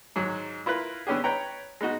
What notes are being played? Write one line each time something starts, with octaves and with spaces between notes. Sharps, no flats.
G#2 F#3
E4 F4 A#4 B4
D3 B3 C#4 G4 G#4
B4 C#5 G5 A#5
G#3 B3 D#4 F#4